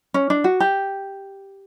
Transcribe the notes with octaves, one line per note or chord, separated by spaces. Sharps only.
C#4
D4
F#4
G4